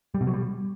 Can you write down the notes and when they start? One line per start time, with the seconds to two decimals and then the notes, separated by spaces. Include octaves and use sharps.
0.14 G3
0.21 B2
0.27 F#3
0.33 G3